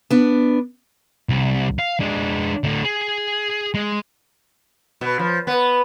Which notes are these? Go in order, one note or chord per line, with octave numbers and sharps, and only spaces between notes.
B3 D4
C2
F5
G#3 D4
A2 D3
G#4
G#3
B2
F3
B3